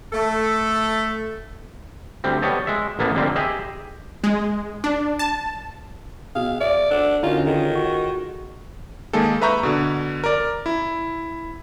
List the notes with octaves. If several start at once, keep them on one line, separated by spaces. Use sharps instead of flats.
A3 A4
D2 G3 C4
G3 B3 C#5 D#5 A5
G#3 E5
A1 A#3 B3 A5
F2 D3 G3 A#3 C4
G4 G#4 D#5 E5
G#3
D4
A5
B2 G#4 F5
D5 E5
D4 A4 F#5
D3 C#4 D#4 F4 F#4 A#4
D#3 F4 G#4 A4
F#4
D#3 G#3 A#3 G#4 A4
B4 E5 A#5 C#6 G6
B2 D3
A#4 D5
E4